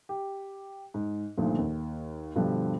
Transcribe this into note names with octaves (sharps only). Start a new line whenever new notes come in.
G4
G#2
D2 G2 A#2 D#3 F3
D#2
G2 B2 D3 F3 G3